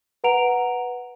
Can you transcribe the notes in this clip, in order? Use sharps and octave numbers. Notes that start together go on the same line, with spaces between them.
B4 F#5 A#5 D7 F7